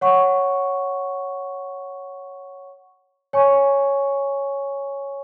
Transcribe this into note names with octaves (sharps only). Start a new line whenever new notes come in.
C#5 F#5 C#6
C#5 G#5 C#6